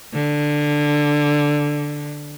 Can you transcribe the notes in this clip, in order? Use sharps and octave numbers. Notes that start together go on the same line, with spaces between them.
D3